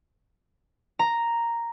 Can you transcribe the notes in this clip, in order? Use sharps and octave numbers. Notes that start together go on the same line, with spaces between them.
A#5